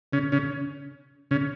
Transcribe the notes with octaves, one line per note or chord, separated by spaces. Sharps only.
C#3 C#4
C#3 C#4
C#3 C#4